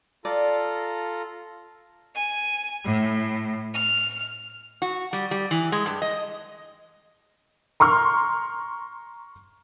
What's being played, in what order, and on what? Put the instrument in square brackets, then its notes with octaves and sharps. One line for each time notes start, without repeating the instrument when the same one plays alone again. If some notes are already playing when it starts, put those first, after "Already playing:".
[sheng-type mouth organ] F4 A4 A#5 [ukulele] D5
[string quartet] G#5
A2
F6
[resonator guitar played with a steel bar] F#4
G3
G3
E3
G#3
G2
D#5
[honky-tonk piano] A#5 C6 C#6 F6